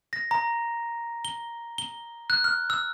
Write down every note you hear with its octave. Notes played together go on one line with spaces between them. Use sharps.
A#6
A#5
G7
G7
F#6
F6
E6